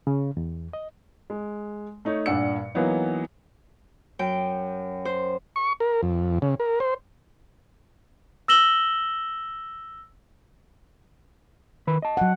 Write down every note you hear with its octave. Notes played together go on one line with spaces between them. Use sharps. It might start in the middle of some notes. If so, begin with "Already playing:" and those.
C#3
E2
D#5
G#3
A3 D#4 C#5
G2 A#2 D4 F#5 E6 C#7
E3 F#3 A#3 B3 D#4
F#2 G5
C5
C#6
A#4
F2
C#3
A#4
C5
E6 A#6 E7 F#7 G7
D#3 B4 B5
D#5 A5
F#3 F#5